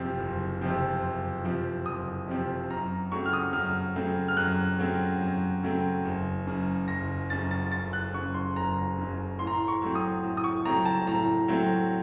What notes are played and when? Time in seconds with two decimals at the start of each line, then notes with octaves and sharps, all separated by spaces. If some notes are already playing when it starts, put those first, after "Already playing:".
Already playing: F#1 F2 C3 F3 C4
0.19 F#1
0.61 F2 C3 F3 C4
1.03 F#1
1.44 F2 C3 F3 C4
1.86 F#1 D#6
2.28 F2 C3 F3 C4
2.70 F#2 A#5
3.12 C#3 F#3 A3 C4 C#6
3.26 F6
3.33 D#6
3.53 F#2 F6
3.96 C#3 F#3 A3 C4
4.28 F6
4.37 F#2 F#6
4.79 C#3 F#3 A3 C4
5.21 F#2
5.63 C#3 F#3 A3 C4
6.05 F#1
6.46 F#2 C#3
6.88 F#1 A#6
7.30 F#2 C#3 A6
7.51 A6
7.71 F#1 A6
7.93 F#6
8.14 C#3 C#6
8.18 F#2
8.34 C6
8.56 F#1 A#5
8.98 F#2 C#3
9.39 A2 C6
9.47 A#5
9.53 C6
9.68 C#6
9.82 F#3 A3 C4
9.95 D#6
10.24 A2
10.37 D#6
10.44 C#6
10.65 F#3 A3 C4 A#5
10.85 A5
11.07 A2 A#5
11.48 F#3 A3 C4